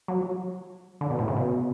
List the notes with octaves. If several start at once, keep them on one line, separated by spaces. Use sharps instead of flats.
F#3
D3
B2
A2
C#3
B2